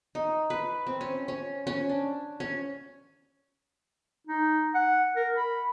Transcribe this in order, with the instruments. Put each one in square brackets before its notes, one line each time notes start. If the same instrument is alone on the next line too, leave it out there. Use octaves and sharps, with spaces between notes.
[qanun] D#4
B4
C4
C#4
C#4
C#4
D4
C#4
[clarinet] D#4
F#5
A#4
B5